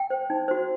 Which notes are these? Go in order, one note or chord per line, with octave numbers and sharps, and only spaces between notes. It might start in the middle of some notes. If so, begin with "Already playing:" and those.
Already playing: G5
C5
D#4
F#4 C5